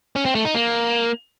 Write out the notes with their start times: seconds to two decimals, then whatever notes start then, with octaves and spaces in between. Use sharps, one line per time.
0.16 C#4
0.25 C4
0.35 A3
0.45 D#4
0.55 A#3